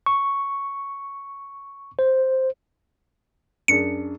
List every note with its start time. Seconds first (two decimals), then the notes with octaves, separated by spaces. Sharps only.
0.06 C#6
1.99 C5
3.68 F#2 D4 G#4 C#7